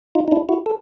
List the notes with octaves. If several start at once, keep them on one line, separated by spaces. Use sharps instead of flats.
D#4 F4
D#4
D4 E4
E4 F#4
A4